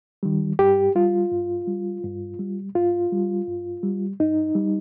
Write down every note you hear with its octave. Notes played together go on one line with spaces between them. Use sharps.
D#3 G3
G2 G4
G3 F4
G2
G3
G2
G3
G2 F4
G3
G2
G3
G2 D#4
G3